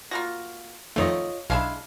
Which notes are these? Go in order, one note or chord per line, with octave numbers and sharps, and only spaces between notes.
A#3 F4 F#4 A#6
F2 D#3 A3 F4 C#5 D#5
B1 G#3 D4 E4 F5